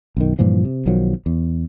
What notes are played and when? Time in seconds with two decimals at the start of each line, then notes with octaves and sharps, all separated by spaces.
0.17 B1 F#2 D#3
0.39 G2 A#2 E3 F3
0.65 C3
0.86 B1 D#3 F3 F#3
1.26 E2